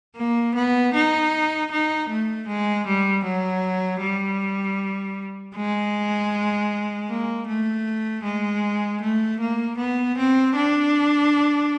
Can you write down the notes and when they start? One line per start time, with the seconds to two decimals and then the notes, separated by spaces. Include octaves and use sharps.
0.16 A#3
0.55 B3
0.94 D#4
1.71 D#4
2.09 A3
2.48 G#3
2.87 G3
3.25 F#3
4.01 G3
5.56 G#3
7.10 A#3
7.47 A3
8.24 G#3
9.02 A3
9.41 A#3
9.78 B3
10.18 C4
10.56 D4